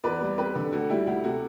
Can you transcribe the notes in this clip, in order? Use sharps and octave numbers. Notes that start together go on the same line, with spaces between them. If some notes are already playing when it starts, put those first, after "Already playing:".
E2 B4 D5
G3
C4 G4 B4
D3
D2 F#4 A4
G3 E4 G4
D2 E4 G4
C3 F#4 A4